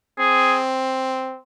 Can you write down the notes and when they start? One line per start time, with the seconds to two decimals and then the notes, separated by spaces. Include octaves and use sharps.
0.19 C4 G#4